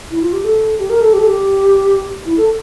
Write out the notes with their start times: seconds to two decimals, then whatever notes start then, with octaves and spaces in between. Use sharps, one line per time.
0.11 E4
0.22 F4
0.33 G4
0.45 A4
0.79 G4
0.90 A#4
1.01 A4
1.13 G4
1.19 A4
1.27 G4
2.26 E4
2.37 A4